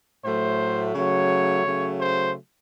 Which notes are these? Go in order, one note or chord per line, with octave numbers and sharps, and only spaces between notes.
A2 F#3 A3 C5
C#3 F#3 A3 C#5
C#3 F#3 A3
C5